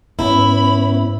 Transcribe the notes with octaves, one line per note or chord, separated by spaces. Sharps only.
G#2 B3 C#4 E4 B5